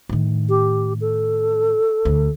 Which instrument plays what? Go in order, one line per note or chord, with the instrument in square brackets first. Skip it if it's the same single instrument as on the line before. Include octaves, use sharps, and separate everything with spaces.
[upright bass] A2 D#3
[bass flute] G4
A4
[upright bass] D2